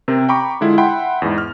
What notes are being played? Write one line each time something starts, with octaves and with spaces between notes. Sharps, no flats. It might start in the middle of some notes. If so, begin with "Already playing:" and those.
C3 C4 A#4
G5 A#5 B5 C#6 D6
D3 G#3 E4 F4
E5 F#5 G5 B5 C6
E2 G#2
F6